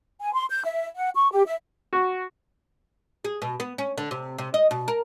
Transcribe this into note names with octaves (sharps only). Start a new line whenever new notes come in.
G#5
C6
G6
E5
F#5
C#6
G4
E5
F#4
G#4
B2
B3
C#4
D3
C3
C3
D#5
B2
A#4